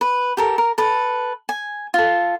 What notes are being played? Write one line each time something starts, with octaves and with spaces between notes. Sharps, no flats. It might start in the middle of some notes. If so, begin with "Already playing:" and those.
B4
G4 A4 A#4
A#4
A4 B4
G#5
F4 A4